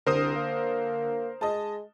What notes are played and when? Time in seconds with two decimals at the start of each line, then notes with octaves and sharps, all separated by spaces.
0.07 C2 D3 A#4 C5 D#6
0.35 A#3
1.41 G#3 D#5 A5